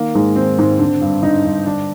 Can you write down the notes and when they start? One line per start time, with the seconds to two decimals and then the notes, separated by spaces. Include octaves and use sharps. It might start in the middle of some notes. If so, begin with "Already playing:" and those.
Already playing: D#3 A#3
0.15 G#2 G#3
0.36 D#3 C4
0.59 G#2
0.79 D3
1.01 G2
1.23 D3 D#4
1.45 G2
1.66 D3 D4